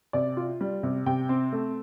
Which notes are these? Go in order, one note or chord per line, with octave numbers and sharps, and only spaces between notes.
C3 D5
F4
G3
C3
C3 G5
C4
A3